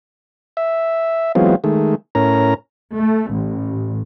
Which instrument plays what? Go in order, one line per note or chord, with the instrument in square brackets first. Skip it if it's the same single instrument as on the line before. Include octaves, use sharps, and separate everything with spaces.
[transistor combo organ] E5
E3 F#3 G#3 B3 C4 F4
D#3 G#3 A3
A2 C#4 A#4 A#5
[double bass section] A3
A1